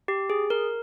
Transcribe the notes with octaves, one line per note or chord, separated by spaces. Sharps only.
G4
G#4
A#4